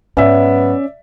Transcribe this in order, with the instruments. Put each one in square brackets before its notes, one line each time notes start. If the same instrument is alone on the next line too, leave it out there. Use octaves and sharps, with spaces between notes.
[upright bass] G#2 F#3 [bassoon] B3 [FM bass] C#4 [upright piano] D5 E5